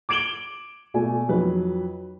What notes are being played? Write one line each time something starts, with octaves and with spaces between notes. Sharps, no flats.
D6 G#6 D7 E7 F#7 G7
B2 A3 D5 G#5
F2 F#3 D#4 B4